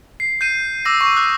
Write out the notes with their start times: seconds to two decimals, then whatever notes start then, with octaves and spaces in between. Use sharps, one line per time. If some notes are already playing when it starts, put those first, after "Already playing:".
0.20 C7
0.41 G6 C7 D#7
0.85 D6 E6 A#6
1.01 C#6
1.16 D#6 F#6